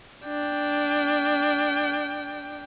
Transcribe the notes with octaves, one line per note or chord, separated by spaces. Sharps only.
D4 G5